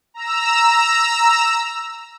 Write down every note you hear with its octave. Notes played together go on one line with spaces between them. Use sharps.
A#5 E6